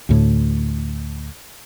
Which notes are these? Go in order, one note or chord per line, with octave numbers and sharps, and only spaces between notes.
D2 A2